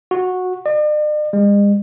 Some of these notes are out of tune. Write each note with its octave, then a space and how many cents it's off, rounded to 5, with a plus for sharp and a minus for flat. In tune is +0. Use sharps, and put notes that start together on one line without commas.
F#4 -15
D5 +45
G#3 -40